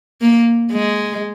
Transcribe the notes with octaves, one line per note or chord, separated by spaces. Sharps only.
A#3
G#3